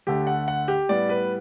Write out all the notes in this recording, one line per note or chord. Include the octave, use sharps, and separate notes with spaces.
D2 D3 A3 G4
F#5
F#5
G4
A2 G3 B3 D5
B4